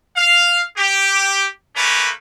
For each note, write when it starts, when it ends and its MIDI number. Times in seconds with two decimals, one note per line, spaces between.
0.16 0.61 77
0.76 1.46 67
1.76 2.08 57
1.76 2.08 58
1.76 2.08 61
1.76 2.08 71